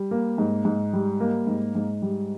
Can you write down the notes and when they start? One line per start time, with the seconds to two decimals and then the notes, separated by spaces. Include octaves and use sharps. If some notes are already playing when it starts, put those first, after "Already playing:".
Already playing: G3
0.11 A#3
0.38 G#2
0.65 G#2
0.93 G3
1.20 A#3
1.47 G#2
1.75 G#2
2.02 G3